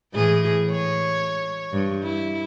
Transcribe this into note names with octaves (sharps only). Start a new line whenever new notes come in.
A2 E3 G#4
C#5
G2
E4